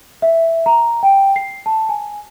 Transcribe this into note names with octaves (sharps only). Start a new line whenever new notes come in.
E5
A#5
G5
C7
A5
G#5